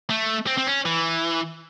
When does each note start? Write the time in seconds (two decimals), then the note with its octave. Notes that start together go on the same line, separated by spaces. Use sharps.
0.10 A3
0.47 C4
0.57 C4
0.67 C#4
0.86 E3